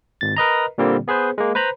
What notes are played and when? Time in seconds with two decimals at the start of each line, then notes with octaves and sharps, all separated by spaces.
0.21 G#1 A6
0.36 A#4 B4 D#5 A#5
0.78 A#2 D3 G3 A#3 C4
1.08 B3 G#4 B4 C5
1.38 G#3 A#3
1.55 B4 C5 A#5 B5